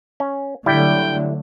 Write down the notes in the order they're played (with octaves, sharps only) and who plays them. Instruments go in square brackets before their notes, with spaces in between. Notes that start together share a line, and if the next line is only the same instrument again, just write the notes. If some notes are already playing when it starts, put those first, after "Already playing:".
[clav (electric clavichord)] C#4
[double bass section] D3 F#3 A3 [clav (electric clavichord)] G3 E4 [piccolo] G5